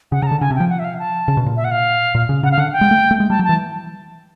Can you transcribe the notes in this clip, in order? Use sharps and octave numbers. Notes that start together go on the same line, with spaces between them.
C#3 F#5
C#3 A#5
D3 A5
C#3 G#5
C3
F3 G5
F#5
E5
F5
A5
C#3
B2
A#2
E5
F#5
F5
A#2
C#3
C#3 F#5
F5
D3 F#5
G5
G#3
A3
A3
G#3
G3 A5
F#3
E3 A5